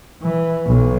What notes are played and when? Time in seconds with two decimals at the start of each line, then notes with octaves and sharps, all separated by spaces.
0.22 E3
0.66 B1